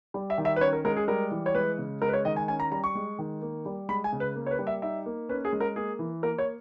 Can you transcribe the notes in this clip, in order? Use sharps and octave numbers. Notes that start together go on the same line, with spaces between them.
G3
E5
D#3
E5
B4
C#4 C#5
A#4
G#3 A#4
G#4
G3 A#4
E3
C#5
G#3 B4
C#3
G#3 A#4
B4
C#5
D#3 D#5
G#5
C#4 G#5
A#5
G3 A#5
C#6
G#3
D#3
A#3
G3
G#3 B5
G#5
C#3
B4
A#3
C#5
B4
G3
E5
D#4 E5
A#3
C#4 B4
G#4
G#3
A#4
A#3 G#4
E3
A#3 A#4
C#5